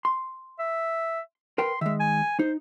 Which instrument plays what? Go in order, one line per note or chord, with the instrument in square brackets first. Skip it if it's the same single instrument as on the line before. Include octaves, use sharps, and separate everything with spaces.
[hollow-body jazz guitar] C6
[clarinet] E5
[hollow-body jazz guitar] A#4 B4 G5 [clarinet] C6
[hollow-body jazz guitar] D#3 G#3 [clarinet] E5
[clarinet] G#5
[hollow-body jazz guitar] D#4 [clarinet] C5